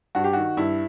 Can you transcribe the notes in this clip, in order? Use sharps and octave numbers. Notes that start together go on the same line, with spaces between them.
G2 F#4
G4
D#3 F#4
G2 E4